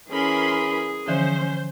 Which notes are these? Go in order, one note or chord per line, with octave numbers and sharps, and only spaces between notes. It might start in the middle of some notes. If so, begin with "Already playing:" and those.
E3 C#4 G#4 A#4 B5 C6
D3 E3 F3 C#4 C5